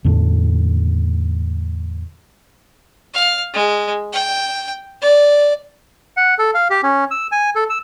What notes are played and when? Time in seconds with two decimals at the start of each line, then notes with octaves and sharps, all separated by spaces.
0.05 E2 A2 D3
3.14 F5
3.54 G#3
4.13 G5
5.01 D5
6.17 F#5
6.38 A4
6.54 F5
6.70 G4
6.83 C#4
7.11 E6
7.32 G#5
7.55 A4
7.70 E6